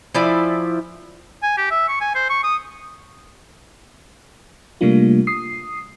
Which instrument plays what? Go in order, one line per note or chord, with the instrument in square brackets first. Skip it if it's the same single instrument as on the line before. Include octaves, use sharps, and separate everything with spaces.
[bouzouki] F3 E4 D5 G#5
[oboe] G#5
G4
E5
C#6
G#5
C5
C#6
D#6
[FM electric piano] C3 G3 A3 A#3 D4 F4
D#6 C7